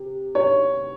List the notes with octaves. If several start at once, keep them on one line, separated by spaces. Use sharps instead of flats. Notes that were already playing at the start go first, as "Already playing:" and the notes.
Already playing: C3
C#5